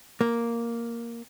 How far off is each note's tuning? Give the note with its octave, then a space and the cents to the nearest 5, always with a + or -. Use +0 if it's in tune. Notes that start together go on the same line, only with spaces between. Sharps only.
A#3 +0